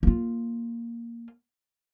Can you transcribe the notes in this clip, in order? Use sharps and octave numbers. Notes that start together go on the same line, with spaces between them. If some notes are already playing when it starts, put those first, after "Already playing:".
A#3 F4